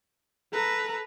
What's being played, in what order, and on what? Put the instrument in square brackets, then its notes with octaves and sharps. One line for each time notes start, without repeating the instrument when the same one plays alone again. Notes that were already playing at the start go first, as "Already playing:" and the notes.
[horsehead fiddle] A4 A#5 [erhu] B4